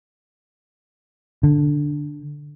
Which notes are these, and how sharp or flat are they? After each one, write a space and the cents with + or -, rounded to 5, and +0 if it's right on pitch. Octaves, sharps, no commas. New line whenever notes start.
D3 +0